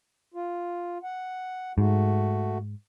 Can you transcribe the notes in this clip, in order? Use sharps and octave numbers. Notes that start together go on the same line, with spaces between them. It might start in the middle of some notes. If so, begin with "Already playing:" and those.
F4
F#5
G#2 A3 F#4